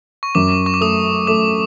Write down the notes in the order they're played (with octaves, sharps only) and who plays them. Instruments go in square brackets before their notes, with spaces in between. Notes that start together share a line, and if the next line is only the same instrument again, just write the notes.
[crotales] C#6
[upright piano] F#2 [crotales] D6
[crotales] C#6
D6
[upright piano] A3 [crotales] D#6
[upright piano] A3 [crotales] D6